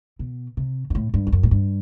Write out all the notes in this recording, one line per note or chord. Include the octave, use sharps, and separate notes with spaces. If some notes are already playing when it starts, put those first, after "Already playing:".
B2
C3
G2
A2
G2
E2
F#2
A2
G2